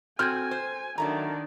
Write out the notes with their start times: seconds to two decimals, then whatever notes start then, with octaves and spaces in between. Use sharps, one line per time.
0.19 C4 F#4 A4 G#5 F6 G6 G#6
0.51 C5
0.98 D#3 F#3 A3 D4 A#5